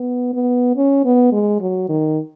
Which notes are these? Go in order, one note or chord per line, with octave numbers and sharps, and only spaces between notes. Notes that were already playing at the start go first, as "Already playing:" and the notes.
Already playing: B3
B3
C#4
B3
G#3
F#3
D#3